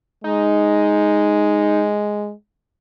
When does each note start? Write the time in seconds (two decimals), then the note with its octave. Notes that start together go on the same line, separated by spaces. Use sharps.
0.24 G#3 D#4